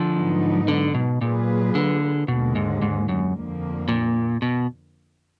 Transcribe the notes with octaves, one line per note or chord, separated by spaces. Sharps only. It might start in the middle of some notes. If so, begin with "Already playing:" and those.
Already playing: D3 F3
G#2 F#3 B3 D#4
D3
B2
A#2 F#3 A#3 F4 G#4 B4
D3
D#2 B2 D3 G#3
G#2
G#2
F#2
F2 D3 F3 A#3
A#2
B2